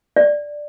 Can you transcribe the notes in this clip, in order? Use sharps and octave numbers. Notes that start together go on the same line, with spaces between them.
D5